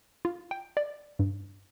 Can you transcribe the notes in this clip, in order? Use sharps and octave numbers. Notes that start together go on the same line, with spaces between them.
F4
G5
D5
G2